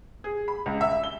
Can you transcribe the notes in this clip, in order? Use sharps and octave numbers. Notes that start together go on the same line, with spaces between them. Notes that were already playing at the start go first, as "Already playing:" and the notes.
G#4
B5
C#2
E5
G7